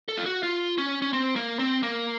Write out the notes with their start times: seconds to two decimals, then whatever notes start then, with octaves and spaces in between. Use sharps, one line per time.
0.09 A4
0.18 F4
0.26 F#4
0.43 F4
0.78 C#4
1.02 C#4
1.13 C4
1.36 A#3
1.59 C4
1.83 A#3